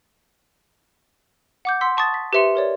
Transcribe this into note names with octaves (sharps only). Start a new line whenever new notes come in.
F#5 D6 G6
F#5 C6 E6 B6
A5 C#6 D#6 A6
B6
G4 B4 C5 E5 C6 C#7
A#4 C#5 D5